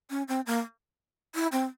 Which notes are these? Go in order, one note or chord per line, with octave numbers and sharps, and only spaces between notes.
C#4
C4
A#3
E4
C4